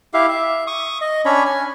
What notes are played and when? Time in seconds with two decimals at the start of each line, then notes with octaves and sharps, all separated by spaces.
0.14 E4 G4 E5 F5
0.28 E5
0.67 C#6 D#6
1.01 D#5
1.25 C#4 D4 C#5 B5
1.45 G#5